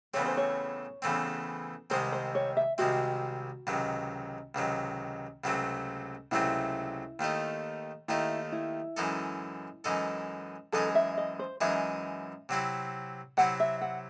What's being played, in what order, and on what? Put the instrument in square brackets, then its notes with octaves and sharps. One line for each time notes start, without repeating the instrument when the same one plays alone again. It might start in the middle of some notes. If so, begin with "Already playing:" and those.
[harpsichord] E2 C#3 E3 A3 C4 [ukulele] C#5
[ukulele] C5
C#5
[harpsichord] E2 C#3 E3 A3 C4
[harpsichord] C2 C3 D#3 G#3 C4 [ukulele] C5
[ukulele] C5
C#5
E5
[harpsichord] C2 C3 D#3 G#3 C4 [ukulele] F#4
[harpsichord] C#2 C3 D#3 F#3
C#2 C3 D#3 F#3
C#2 C3 F#3 A3 C4
[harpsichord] C#2 C3 F#3 A3 C4 [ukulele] E4
[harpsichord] D#2 D#3 A3 D#4
[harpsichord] D#2 D#3 A3 D#4 [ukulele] E4
[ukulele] E4
[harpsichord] F#2 E3 G#3 D#4 A4
F#2 E3 G#3 D#4 A4
[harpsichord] F#2 E3 G#3 D#4 G#4 [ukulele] A4
[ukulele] E5
D#5
C5
[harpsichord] F#2 E3 G#3 D#4 G#4 [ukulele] E5
[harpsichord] C3 F#3 C4 E4
[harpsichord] C3 F#3 C4 E4 [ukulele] F#5
[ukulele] E5
F#5